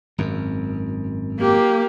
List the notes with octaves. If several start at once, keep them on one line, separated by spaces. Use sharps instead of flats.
G#1 F#2
A#3 G4